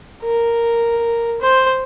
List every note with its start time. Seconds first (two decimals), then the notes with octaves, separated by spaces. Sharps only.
0.23 A#4
1.41 C5